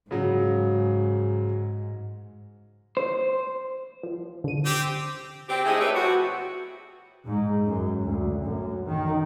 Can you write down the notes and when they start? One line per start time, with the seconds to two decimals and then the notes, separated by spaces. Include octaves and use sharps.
0.11 G#2 C#3 F#3
2.97 C5
4.03 F3
4.44 D3 D#7
4.66 C4 G4
5.49 C4 G4
5.65 G#3 A3 D#4 E4 G#4
5.80 G3 A3 C#4 G4 B4 E5
5.95 B2 F3 C4 F#4
7.25 G#2
7.67 F#2
8.04 D2
8.43 F#2
8.87 D#3